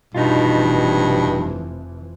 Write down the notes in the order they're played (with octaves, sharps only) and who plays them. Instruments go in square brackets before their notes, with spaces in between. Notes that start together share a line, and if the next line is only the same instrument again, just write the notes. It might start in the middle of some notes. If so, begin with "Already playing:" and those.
[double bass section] F1 E3 F3 [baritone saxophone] G2 [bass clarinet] B2 [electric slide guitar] D#4 F4